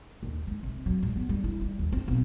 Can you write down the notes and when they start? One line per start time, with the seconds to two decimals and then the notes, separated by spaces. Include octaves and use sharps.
0.23 D#2
0.47 G#3
0.63 C2
0.86 F#3
1.03 G#2
1.16 B3
1.29 G3
1.44 E4
1.61 G3
1.79 D#2
1.92 C4
2.08 B1